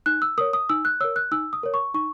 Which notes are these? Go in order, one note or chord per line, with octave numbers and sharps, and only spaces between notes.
D#4 F#6
E6
A#4 C#5 D#6
D#6
D#4 E6
F#6
A#4 C#5 E6
F#6
D#4 E6
D#6
A#4 C#5
C#6
D#4 C#6